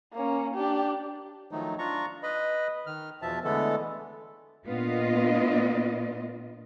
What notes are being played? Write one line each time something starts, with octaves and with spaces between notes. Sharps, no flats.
A#3 C#4
D4 G4
D#3 F3 F#3 A3 D#4
D4 F4 A#5 C#6
B4 D#5 B5
D#3 F6
E2 B2 F3 E5 A5
D3 E3 G#3 A3 B3 A4
A#2 A#3 B3 D4 F4 D#5